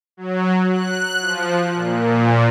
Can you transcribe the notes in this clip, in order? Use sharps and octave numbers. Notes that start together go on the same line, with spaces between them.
F#3
F#6
F3
A#2